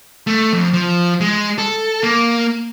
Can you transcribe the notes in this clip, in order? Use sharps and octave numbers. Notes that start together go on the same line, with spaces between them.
A3
F2
F3
G#3
A4
A#3